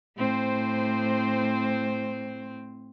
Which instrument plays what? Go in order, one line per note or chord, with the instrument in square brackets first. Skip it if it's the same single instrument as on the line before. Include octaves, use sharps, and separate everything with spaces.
[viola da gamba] A2 C4 C5